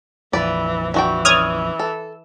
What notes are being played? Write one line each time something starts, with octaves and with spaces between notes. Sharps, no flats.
A#1 F2 E3 B4 D5
E3 D4 F#4 G5
C#4 D5 D#6 F6 G#6
A4